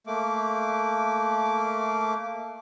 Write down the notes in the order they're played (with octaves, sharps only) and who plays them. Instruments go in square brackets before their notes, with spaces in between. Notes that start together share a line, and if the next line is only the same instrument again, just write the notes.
[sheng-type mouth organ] A3 A#3 D6